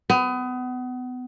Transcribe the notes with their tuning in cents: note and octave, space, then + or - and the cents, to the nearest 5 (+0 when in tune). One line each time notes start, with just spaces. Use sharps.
B3 +30